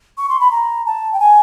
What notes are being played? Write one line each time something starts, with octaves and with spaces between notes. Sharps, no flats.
C#6
C6
B5
A#5
A5
G5
G#5